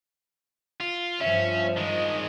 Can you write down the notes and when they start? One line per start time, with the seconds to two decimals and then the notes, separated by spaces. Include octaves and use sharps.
0.80 F4
1.20 G2 F3 C#4 E5
1.77 D#3 G#3 D#5